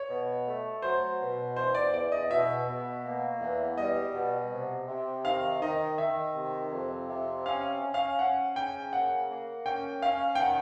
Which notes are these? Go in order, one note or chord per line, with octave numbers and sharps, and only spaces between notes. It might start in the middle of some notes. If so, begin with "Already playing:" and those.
Already playing: C#5
B2
A3
F#3 C5
B2
E2 C5
D5
E2 D5
D#5
B2 E5
B2
A#3
E2
G3 D#5
B2
C3
C3
D#3 F5
D#3 D#5
D#3 E5
C3
F2
C3
C#4 F5
C#4
F5
C#4 F#5
C#3 G5
A#3 F#5
A#3
C#4 G5
C#4 F5
G5
D#3 F#5